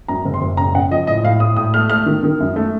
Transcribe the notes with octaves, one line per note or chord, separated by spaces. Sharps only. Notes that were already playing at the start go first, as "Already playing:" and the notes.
F#2 A#5
F#1
C6
F#1
C#3 A#5
C#3 F#5
F3 D#5
A2 D#5
A2 F5
A2 D#6
A2 D#6
A3 F6
A3 F6
D#3
D#3
F#2
A3